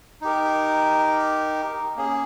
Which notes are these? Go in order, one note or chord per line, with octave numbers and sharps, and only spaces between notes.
D#4 G4 A#4
A#3 C#4 G#4